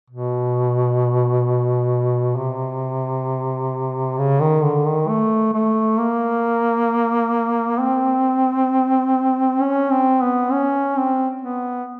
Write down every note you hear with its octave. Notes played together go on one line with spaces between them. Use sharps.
B2
C3
C#3
D#3
D3
D#3
A3
A3
A#3
C4
C#4
C4
B3
C#4
C4
B3